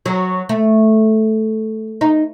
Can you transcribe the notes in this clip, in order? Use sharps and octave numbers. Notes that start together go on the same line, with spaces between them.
F#3
A3
D#4